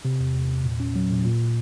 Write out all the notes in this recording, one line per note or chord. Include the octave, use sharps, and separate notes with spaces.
C3
E2
E2
E2
A#2
C#4
F#3
A#2
A#2